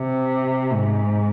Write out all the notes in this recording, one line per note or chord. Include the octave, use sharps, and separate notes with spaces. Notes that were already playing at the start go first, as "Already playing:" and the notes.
Already playing: C3
G#2